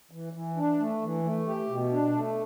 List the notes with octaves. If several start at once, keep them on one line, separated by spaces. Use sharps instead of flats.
E3
E3
D4
A3
E3
A3
G4
B2
D4
A3